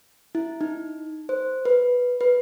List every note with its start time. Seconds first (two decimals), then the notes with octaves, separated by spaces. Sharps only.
0.35 E4
0.61 D#4
1.29 C5
1.65 B4
2.21 B4